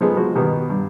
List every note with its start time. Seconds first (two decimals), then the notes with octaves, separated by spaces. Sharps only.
0.01 F3 G#3 B3 D#4 G#4 A4
0.16 F3 F#3 G#3 F#4
0.35 B2 D#3 G3 B3 G4
0.70 G2